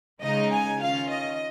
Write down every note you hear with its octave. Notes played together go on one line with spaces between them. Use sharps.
C#3 G#3 D#4 D#5
G#5
D#3 C#4 F4 F5
D#5